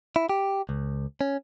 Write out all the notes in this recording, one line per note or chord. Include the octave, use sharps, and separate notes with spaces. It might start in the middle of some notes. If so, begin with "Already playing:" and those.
E4
G4
C#2
C#4